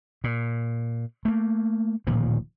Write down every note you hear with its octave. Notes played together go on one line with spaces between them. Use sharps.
A#2
A3 A#3
D1 A#2 D#3 F3